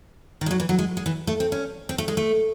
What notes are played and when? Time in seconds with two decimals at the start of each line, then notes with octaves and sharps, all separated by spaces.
0.41 D#3
0.46 G#3
0.51 F#3
0.60 E3
0.69 F#3
0.79 G#3
0.97 G#3
1.06 E3
1.27 A3
1.40 C4
1.52 C#4
1.89 C4
1.98 A3
2.08 G#3
2.17 A3